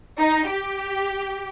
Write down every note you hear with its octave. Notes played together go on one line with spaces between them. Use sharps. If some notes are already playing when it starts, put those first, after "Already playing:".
D#4
G4